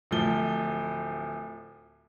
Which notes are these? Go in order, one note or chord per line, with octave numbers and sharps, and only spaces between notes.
D1 A2 F3 G7